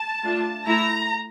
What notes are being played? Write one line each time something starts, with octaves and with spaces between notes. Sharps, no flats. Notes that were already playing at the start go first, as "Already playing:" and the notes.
Already playing: A5
A3 D4 F4
A3 E4 A#5